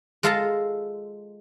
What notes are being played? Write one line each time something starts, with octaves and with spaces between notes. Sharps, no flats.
G#3 F4 A4 F5 A5 A#5